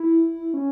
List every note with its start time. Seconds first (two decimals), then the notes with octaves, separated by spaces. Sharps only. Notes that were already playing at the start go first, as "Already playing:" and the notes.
Already playing: E4
0.54 C#4